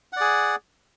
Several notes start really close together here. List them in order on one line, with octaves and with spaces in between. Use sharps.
F#5 D5 G#4